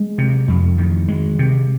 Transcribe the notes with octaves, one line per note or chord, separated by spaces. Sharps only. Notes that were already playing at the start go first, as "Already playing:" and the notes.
Already playing: G#3
C3
F2
D#3
G#3
C3